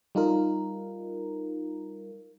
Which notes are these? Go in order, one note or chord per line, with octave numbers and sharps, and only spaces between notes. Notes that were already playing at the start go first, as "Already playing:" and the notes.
G3 D#4 F4 A#4